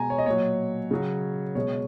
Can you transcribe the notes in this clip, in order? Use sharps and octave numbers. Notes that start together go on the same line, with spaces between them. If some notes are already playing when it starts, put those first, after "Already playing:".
Already playing: B2 G#3 G#5 A#5
C#5
D#5
A#2 F#3 C#5
C#3 F#3
B2 G#3 C#5